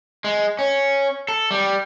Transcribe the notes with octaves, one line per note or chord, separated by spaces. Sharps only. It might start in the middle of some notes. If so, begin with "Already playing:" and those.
G#3
C#4
A4
G3